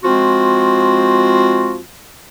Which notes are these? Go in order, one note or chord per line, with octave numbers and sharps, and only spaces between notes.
F3 G#3 C4 F4 F#4